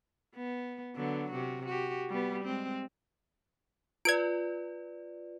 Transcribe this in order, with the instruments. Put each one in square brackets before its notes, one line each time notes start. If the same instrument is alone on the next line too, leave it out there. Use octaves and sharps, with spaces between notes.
[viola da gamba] B3
D3 F#3 B3
C3 F#4
F#4 G4
G3 B3
G#3 C4
[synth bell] F4 B4 D5 [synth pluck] G#6 D7